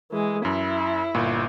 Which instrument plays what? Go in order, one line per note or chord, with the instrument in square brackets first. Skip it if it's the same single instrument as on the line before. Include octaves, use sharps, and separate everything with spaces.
[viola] E3 G#3
[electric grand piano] F#2 [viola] E4
[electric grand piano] G1 A#2